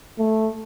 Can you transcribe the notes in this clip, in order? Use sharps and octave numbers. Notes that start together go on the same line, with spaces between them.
A3